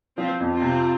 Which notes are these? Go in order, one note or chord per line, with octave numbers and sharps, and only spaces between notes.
F3 C4 F4
F2
C4 F4
C3